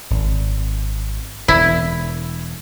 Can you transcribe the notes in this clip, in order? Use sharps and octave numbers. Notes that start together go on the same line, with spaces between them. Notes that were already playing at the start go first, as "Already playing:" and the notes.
G#1
E1 E4